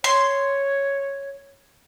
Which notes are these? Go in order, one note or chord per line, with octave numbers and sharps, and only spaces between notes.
C#5 C6